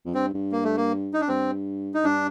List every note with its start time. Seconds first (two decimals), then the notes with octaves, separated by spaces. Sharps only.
0.06 F2
0.14 G2 C4
0.34 G2
0.52 A#3
0.64 A3
0.77 A#3
1.14 D#4
1.21 D4
1.28 G2 C4
1.94 D#4
2.04 G2 D4